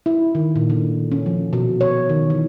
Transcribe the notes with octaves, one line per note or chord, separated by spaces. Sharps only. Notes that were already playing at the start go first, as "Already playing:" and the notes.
E4
D#3
A#2
D3
C#4
F3
B2
C#5
D#3
E3